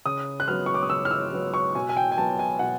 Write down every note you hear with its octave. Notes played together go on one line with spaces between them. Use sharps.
C#3 D#6
F#6
F#3 B3 F6
C#6
D6
D#6
C#3 E6
F6
E6
F#3 B3
C#6
B2 G#5
G#5
G5
G#5
F#3 B3 A5
G#5
B2 F#5